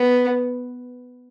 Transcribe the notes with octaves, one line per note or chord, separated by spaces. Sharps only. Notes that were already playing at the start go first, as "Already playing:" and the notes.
Already playing: B3